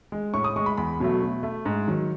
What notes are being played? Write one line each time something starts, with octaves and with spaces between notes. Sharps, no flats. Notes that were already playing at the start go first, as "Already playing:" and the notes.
G#3
A2 C#6
D#6
G#3 C#6
B5
E2 B5
B2 F#3 A3
B2
A3
G#2
D#3 F#3